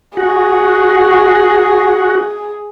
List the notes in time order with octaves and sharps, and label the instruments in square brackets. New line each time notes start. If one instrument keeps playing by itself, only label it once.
[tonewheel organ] F#4 [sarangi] G#4